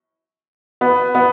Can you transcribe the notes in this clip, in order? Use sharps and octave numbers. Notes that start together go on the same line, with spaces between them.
B3
B3